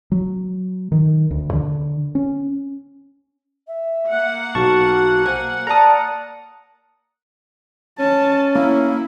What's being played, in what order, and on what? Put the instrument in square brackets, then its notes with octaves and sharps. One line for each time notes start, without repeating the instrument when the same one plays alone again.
[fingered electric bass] F#3
D#3
D2
D3
C#4
[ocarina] E5
[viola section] A#3 F#5
[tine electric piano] B1 A5 C#6 [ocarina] F#4
[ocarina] C5 [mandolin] G#5
[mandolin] A#4 A5 [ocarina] D5 [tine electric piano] A#5 D#6
[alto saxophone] C#4 [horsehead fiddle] A5
[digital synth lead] A#3 [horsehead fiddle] E4